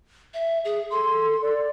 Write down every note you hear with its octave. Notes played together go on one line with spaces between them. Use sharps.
E5
G#4
A4 C6
D5